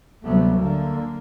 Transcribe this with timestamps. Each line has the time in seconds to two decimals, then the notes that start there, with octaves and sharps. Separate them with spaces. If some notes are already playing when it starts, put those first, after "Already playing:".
0.24 D2 C3 F#3 G3 A3 B3
0.55 D3 A#3